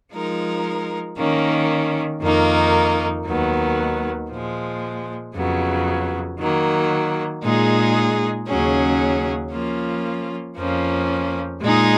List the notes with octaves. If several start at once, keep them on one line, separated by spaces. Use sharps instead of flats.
F3 G#3 D#4 A#4
D#3 A#3 C#4
F2 D#3 A#3 D#4
D#2 D#3 F#3 B3
A#2 F3 G#3
F2 C#3 F#3 B3
D#3 F#3 A#3
A#2 G#3 D#4 G#4
D#2 C#3 F#3 C#4 G#4
F3 A#3 C#4 F4
F2 F3 A#3 C#4
A#2 G#3 D#4 G#4